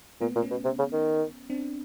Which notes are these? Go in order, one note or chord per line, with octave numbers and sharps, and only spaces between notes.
A#2 A3 B3
A#2
B3 C#4
B2
C3
C#3
D#3
C4 D4